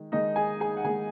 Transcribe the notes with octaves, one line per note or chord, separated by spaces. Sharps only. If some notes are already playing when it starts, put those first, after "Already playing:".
Already playing: D#3 G#3
D#3 G#3 D#4 D#5
G#4 G#5
G#4 G#5
F#5
D#3 G#3 G#4 G#5